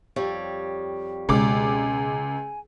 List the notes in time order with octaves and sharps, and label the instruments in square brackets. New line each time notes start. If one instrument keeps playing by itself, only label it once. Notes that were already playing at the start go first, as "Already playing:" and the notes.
[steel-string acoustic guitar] F2 G3 C#5
[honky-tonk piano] C#2 D6 [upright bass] B2 G#3 [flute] G#5